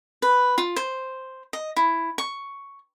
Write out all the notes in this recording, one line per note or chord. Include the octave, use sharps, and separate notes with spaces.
B4
F4
C5
D#5
E4
C#6